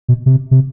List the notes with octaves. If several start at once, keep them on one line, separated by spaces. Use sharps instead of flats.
B2
C3
C3